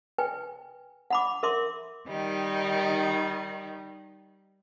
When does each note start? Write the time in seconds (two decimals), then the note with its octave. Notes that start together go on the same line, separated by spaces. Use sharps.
0.18 B4 G5 G#5
1.10 F#5 B5 D6
1.43 A#4 E5 C6 D6
2.08 D#3 G3 D#4